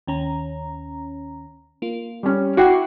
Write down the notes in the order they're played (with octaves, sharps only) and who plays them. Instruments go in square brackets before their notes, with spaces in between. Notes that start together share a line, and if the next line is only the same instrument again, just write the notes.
[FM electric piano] D#2 C#4 A#5
A#3 F4
[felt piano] G3 C#4
[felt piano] E4 F#5 G5 [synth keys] F#4 [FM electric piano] D6 C7